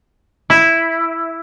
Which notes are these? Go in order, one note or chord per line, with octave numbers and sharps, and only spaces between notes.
E4